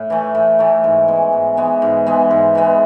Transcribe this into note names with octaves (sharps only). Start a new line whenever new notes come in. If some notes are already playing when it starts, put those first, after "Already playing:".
Already playing: A2
E3 A3
A2
E3 A3
G#2
E3 G#3 B3
G#2
E3 G#3 B3
G#2
E3 G#3 B3
G#2
E3 G#3 B3